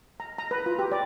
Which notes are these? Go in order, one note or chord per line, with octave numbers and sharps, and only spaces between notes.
A#5
A#5
B4
F4
G4
D5